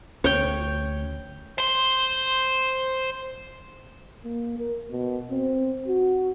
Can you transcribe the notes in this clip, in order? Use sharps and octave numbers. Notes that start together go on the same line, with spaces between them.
D2 C#4 C#5 G5
C5 C6
A#3
A#4
B2
C4
F#4